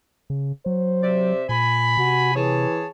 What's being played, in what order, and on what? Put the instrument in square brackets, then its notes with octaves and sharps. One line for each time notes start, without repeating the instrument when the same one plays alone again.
[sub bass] C#3
[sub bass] F#3 [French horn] C5
[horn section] C3 D5 E5
[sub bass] A#2 [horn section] G#5 B5
[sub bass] C3 [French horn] F#4
[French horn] E3 [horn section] G#4 C#5 A5